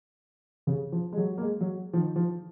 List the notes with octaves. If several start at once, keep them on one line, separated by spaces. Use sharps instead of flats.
C#3
F3
G#3
F#3
A#3
G#3
F#3
F3
D#3
F3